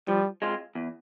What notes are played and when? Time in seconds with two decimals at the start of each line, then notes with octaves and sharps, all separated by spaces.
0.08 F3 G3
0.42 G#3 C4 F4
0.75 E2